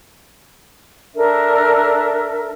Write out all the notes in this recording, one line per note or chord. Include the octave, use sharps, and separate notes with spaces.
D4 A4 A#4 E5